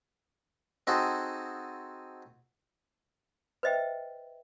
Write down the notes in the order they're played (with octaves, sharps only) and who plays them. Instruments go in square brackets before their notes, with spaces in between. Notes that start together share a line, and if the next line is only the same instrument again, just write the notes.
[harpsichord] C4 D#4 F#4 G#4 A4
[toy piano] B4 C5 D#5 E5 G5